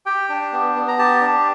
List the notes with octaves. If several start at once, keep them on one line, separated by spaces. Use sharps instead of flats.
G4 G5
D4
B3
B3
A#5
G4 A5
D4